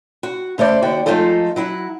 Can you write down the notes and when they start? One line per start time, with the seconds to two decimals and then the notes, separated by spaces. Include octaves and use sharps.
0.23 F#4
0.58 C#3 A3 C5 D5
0.82 D#2 F#4 D5 G5
1.06 F3 G#3 A3 D#4 F4 A4
1.56 F#3 E4 F#5